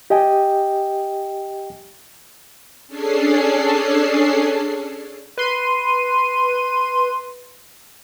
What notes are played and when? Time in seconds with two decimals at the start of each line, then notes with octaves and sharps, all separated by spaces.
0.10 G4 D#5 G5 G#5
2.88 C#4 D4 G#4 A4 C7
5.38 B4 C6 D#7